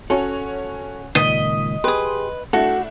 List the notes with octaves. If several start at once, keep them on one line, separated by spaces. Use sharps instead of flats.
C#4 F#4 A4 C#5
C#2 A#2 D#3 D#5 B6
G4 G#4 B4 C6 D#6
A3 D4 E4 F#4 A4